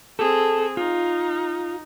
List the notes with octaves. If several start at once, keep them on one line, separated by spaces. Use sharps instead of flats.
C4 G#4 A4
D#4 F4